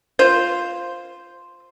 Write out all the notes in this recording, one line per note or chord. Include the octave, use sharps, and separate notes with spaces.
F4 C5